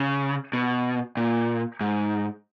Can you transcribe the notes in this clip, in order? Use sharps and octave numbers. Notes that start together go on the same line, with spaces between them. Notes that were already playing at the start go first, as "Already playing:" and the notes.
Already playing: C#3
B2
A#2
G#2